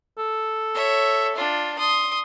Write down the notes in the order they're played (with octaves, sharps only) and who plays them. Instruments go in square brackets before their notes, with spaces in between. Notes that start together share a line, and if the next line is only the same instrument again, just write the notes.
[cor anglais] A4
[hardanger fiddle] C#5 E5
D4 F4
C6 D#6